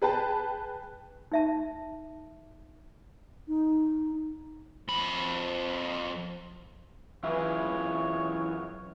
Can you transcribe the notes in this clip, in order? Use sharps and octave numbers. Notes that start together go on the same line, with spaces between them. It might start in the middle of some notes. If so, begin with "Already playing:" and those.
G#4 B4 G5 A5
D#4 E5 A5
D#4
F2 B5
F#2 E3 F4 G#4 C#5